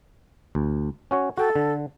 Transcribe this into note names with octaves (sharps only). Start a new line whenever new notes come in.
D2
C#4 F#4 C#5
F#4 A4 G5
D3